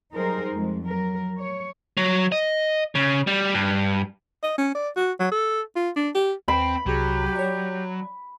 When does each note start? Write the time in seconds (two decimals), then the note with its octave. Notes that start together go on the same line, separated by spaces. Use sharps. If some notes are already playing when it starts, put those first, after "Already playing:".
0.12 F#3 G3 D#4 G#4 A#4 C5
0.52 F2 G#3
0.83 F#3 A#4
1.39 C#5
1.97 F#3
2.32 D#5
2.95 C#3
3.27 G3
3.54 G2
4.43 D#5
4.58 C#4
4.75 D5
4.96 F#4
5.20 F#3
5.32 A4
5.76 F4
5.96 D4
6.15 G4
6.48 D#2 C4 G5 B5
6.86 C2 C3 F#3 G4 G#4
7.35 C#5 D5